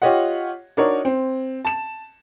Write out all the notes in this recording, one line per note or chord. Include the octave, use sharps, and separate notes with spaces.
F4 G4 C#5 D#5 F#5
D4 D#4 F#4 A#4 C#5
C4
A5 E7